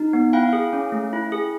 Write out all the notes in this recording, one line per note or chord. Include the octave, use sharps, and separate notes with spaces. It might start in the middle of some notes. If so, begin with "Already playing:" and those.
Already playing: D#4
B3
E4 F5 G5
G#4
C#4
A3
E4
G#4